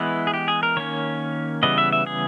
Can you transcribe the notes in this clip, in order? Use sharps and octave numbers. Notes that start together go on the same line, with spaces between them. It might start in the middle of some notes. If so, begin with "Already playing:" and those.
Already playing: E3 G#3 B3 E4
G#4
G4
G#4
A#4
D#3 A#3 C#4 C#5
C#3 E3 G3 B3 D#5
E5
E5
G#4